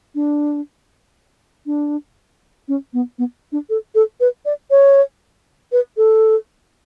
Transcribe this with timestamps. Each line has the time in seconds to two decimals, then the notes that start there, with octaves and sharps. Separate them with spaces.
0.15 D4
1.66 D4
2.68 C#4
2.93 B3
3.19 B3
3.52 D4
3.70 A4
3.95 A4
4.20 B4
4.45 D5
4.71 C#5
5.72 B4
5.97 A4